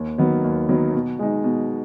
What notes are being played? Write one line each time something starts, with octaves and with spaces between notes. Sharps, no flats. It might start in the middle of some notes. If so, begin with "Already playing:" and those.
Already playing: D#2
D#3 F#3 B3
D#2
D#3 F#3 B3
B2
G#3 D#4
B2